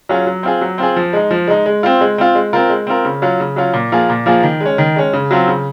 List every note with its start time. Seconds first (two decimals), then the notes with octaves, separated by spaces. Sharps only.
0.09 F#3 C#4 F4 G#4
0.27 F#3
0.43 C4 F4 G#4
0.61 F#3
0.78 C4 F4 G#4
0.96 F3
1.13 G#3 D#4
1.31 F3
1.48 G#3 D#4
1.66 G#3
1.83 C4 F4
2.01 G#3
2.18 C4 F4
2.35 G#3
2.53 C4 F4 A#4
2.70 G#3
2.87 C4 F4 A#4
3.05 C#3
3.22 F#3 C#4 F4
3.40 C#3
3.56 F#3 C#4 F4
3.74 A#2
3.92 F3 A#3 F4 G#4
4.10 A#2
4.26 F3 A#3 F4 G#4
4.43 D#3
4.61 G#3 C#4
4.78 D#3
4.96 G#3 C#4
5.13 C#3
5.31 F#3 C4 F4
5.47 C#3